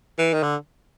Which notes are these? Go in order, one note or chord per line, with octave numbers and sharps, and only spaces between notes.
E3
D#3
D3